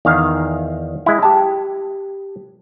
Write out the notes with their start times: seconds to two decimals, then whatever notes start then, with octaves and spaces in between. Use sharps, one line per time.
0.05 E2 D#3 F5
1.06 G#3 E4
1.23 G4 A5